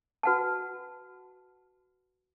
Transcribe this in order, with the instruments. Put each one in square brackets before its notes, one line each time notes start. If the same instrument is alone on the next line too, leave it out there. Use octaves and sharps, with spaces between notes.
[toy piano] F#4 B4 F#5 A5